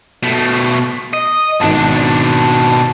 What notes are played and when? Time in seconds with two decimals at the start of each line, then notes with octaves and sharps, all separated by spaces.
0.23 B2 A3
1.13 D#5
1.60 G#1 B2 D4 A5